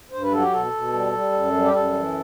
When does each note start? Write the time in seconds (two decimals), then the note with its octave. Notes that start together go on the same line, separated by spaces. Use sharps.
0.12 G2 C5
0.22 B4
0.32 F#3 A4
0.42 G4
0.52 B2 A4
0.73 B2
0.93 G3
1.13 G3
1.32 F#2
1.53 G3
1.65 G4
1.73 F#2 A4
1.93 E3